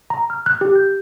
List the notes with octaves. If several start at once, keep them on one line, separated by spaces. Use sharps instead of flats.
A#5
F6
F#6
G4
G6